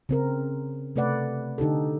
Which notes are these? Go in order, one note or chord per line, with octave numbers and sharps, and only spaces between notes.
C#3 C4 A#4
C3 A3 B4 D5 F#5
D3 D#4 G4 A4